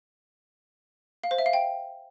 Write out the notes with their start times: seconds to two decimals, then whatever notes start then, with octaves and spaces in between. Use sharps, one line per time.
1.24 F5
1.31 C5
1.38 E5
1.46 F5
1.53 G5